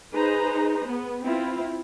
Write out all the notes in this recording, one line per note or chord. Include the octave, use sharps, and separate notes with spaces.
D#4 G#4 B4 C5 A#5
B3
C4 E4 F4